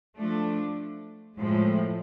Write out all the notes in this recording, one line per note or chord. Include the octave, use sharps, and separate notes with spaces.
F3 A3 D4
A2 F3 G#3